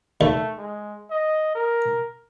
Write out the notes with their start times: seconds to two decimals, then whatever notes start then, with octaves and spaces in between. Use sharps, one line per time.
0.21 D#2 A3
0.58 G#3
1.10 D#5
1.55 A#4